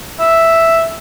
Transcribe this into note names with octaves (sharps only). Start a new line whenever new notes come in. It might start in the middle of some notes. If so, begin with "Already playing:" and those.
E5